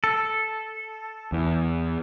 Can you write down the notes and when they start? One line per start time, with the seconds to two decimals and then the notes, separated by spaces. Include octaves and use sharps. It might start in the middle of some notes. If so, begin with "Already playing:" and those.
0.04 A4
1.32 E2